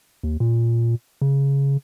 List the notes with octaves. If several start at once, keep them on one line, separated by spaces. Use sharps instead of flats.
D#2
A#2
C#3